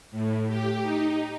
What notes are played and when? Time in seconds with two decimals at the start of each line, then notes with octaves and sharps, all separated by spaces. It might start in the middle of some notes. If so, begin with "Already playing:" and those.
0.11 A2
0.48 G4
0.82 D#4